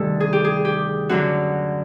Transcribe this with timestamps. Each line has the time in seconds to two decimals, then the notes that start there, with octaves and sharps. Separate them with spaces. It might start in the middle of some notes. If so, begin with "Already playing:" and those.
Already playing: D2 C3 D#3 G3 A4
0.20 G#4
0.33 G4
0.44 G#4
0.65 G4
1.09 F#2 D3 F#3 F#4